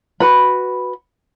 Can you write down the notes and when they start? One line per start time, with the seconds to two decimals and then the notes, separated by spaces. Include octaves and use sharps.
0.20 F#4 B4 B5